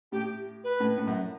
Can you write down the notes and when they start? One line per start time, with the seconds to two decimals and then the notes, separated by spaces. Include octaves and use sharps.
0.12 A2 G4
0.64 B4
0.80 A2
0.98 A2
1.07 F#2